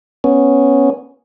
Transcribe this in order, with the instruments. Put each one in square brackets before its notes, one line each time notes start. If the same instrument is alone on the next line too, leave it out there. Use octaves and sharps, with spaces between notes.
[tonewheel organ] B3 C#4